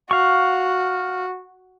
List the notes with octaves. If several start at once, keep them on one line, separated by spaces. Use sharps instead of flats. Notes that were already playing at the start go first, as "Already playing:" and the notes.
F#4 F5 C#6